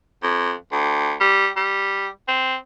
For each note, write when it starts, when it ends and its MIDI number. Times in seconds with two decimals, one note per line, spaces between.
0.23 0.53 41
0.72 1.14 38
1.21 1.48 55
1.57 2.08 55
2.28 2.56 60